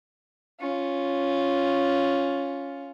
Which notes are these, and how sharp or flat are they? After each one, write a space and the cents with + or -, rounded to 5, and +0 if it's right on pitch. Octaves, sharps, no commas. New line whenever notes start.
C#4 +0 F4 +0